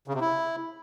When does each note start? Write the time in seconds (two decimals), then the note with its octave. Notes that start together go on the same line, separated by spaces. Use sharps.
0.08 C#3
0.14 C3
0.21 E4